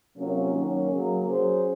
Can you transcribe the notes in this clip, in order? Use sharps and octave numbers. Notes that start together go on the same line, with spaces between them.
C3 F#3 A#3 C#4 F4
D#3 F#3 A#3 C#4
C#3 F#3 A#3
F#3 C#4 G#4 C5